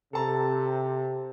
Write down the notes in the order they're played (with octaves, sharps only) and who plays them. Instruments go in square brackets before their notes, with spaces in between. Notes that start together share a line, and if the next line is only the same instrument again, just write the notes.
[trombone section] C3 [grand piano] A4 A5 A#5